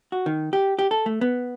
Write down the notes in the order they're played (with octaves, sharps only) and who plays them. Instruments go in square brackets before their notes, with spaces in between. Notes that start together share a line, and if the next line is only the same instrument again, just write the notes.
[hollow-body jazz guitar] F#4
D#3
G4
G4
A4
A3
B3